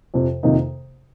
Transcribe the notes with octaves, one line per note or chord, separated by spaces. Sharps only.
F2 C3 F3
F2 C3 D#3 A#3 D#4